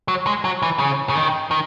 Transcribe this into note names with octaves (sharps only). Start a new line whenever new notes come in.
F#3
G#3
F#3
E3
C#3
C#3
D#3
D#3